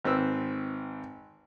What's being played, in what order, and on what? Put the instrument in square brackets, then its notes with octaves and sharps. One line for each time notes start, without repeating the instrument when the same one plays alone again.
[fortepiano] G#1 C4 B4 E6